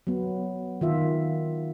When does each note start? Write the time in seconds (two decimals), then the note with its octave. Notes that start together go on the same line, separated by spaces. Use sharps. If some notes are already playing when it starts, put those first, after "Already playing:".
0.07 F#3 B3
0.81 D#3 F4 E5